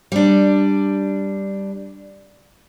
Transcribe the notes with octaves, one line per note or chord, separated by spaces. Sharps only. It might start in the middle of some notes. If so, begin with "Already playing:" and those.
G3 D4